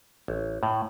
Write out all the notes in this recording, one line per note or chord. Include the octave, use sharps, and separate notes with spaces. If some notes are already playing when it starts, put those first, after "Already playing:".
A1
A2